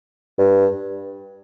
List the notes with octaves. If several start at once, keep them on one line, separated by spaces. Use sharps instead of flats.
G2